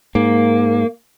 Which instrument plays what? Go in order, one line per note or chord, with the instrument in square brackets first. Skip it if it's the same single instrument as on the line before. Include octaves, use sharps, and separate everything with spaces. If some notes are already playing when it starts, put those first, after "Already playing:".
[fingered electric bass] G#2 [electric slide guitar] A#3